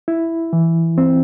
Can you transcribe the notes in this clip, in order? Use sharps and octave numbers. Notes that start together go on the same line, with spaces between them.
E4
E3
C4